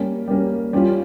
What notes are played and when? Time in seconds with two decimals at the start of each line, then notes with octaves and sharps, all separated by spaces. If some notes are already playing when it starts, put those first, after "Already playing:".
Already playing: G3 A#3 C#4
0.28 G3 A#3 C#4
0.73 G3 C#4 F4